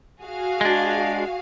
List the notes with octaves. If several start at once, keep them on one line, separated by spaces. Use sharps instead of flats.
F#4 G#4 F5
G#3 D4